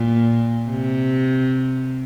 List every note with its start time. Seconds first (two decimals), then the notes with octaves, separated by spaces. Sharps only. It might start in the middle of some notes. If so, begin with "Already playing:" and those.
Already playing: A#2
0.70 C3